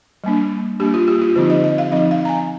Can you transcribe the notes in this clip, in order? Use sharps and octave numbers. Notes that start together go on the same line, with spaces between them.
G3 A#3 D4
G3 A#3 D4 G4
F4
G4
F4
D3 F3 C4 D#4 G4
D#5
D#5
F5
F3 C4 D#4 D#5
F5
A#5
G#5